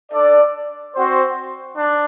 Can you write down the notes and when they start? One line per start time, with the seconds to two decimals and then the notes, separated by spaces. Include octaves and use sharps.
0.11 D4 A4 D5
0.93 C4 F#4 C5
1.77 D4